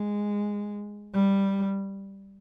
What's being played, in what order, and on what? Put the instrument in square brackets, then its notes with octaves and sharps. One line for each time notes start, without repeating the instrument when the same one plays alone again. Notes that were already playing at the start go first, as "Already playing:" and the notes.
Already playing: [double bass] G#3
G3